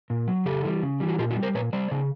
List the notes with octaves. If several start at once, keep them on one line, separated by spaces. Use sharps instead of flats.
A#2
F#3
C#3 G4 A4
E3 G3
C#3
E3 G3
F#4
A#2 F4 G4
E4 F#4
G3
A#4 C5
A#2 B4 C#5
G3 C5 D5
C#3